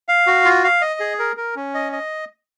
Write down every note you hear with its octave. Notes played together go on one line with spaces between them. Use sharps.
F5
F#4
F4
F5
D#5
G#4
A#4
A#4
C#4
D#5
D#5